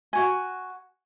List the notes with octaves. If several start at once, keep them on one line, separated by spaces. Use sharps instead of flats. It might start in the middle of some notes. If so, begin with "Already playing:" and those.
F#4 G#5